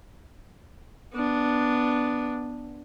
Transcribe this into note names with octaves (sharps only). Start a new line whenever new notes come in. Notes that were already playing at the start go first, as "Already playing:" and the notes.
B3 D4